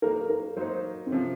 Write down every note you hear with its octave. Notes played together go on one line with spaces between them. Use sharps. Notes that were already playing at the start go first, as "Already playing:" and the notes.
F#3 A#3 D#4 A#4
A#4
F#3 A#3 D#4 C5
C4
C3 F3 C#4